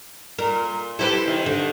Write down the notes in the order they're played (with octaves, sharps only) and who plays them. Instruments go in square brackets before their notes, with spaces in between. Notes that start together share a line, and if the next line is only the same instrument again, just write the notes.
[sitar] A#2 [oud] A#4
[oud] E4 G4 B4 [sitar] A4 C5
[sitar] C3 D#3
[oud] D3